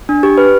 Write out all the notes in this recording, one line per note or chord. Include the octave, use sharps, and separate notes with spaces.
D4
G4
B4